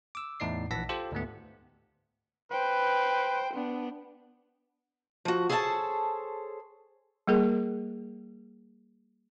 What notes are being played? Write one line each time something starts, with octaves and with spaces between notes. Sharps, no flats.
D6 E6
E2 A2 D#4 D5 C7
A#1 E3 F#5 A5 A#6 B6
F4 G4 A4 C5
D2 G#2 A3 B3
B4 C5 G5
B3 D4
F3 F#4
G#4 A4 C5 C#5 F#5 A5
G3 A#3 G#4 A#4